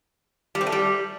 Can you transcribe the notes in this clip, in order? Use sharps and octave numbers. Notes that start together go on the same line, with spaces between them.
G3
C4
A3
G3